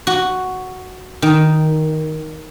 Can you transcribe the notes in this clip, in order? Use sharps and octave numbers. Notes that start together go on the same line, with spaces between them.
F#4
D#3